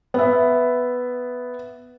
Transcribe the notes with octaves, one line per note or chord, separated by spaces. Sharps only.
B3 E5